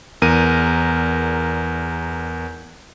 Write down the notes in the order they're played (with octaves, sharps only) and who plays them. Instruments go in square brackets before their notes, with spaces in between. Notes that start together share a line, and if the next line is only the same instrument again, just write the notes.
[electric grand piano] E2 A#4 D#7